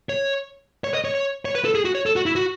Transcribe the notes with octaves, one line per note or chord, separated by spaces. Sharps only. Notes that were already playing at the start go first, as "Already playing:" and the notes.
C#5
C#5
D#5
C#5
C#5
C#5
B4
A4
G#4
F#4
C#5
A4
F#4
E4
F#4